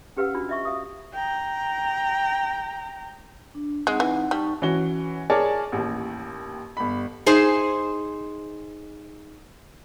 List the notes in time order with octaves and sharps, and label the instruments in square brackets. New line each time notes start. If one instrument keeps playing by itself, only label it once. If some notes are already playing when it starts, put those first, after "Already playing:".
[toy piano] C#4 G4 B4 F5 F#5 E6
D4 F4 F#4
D#5 E5 C#6
E5 F5 D#6
[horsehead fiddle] G5 A#5
[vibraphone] D4
[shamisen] G#3 [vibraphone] C4 D#4 F#5
[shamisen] E3
[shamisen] G3 [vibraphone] D#4 A5 C#6
[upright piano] E3 C#4 F#4 G7
G#4 A#4 C#5 D5 A5
A1 D#2
G1 B5
[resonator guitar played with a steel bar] D#4 G#4 C5